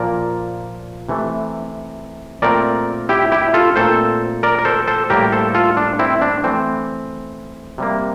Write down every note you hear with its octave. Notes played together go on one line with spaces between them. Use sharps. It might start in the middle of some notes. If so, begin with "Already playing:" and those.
Already playing: A#2 F3 A#3 A#4 D5
C3 E3 A3
A#2 A3 C4 A#4 D5
E4 G4
E4 G4
F4 A4
A#2 A3 C4 A4 C5
A#4 D5
A#4
A4 C5
A4 C5
A2 G3 A#3 G4 A#4
A4 C5
F4 A4
D4
C4 E4
D4
E3 A3 C4
C3 G3 A#3